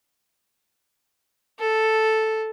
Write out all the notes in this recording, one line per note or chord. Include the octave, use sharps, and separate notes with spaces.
A4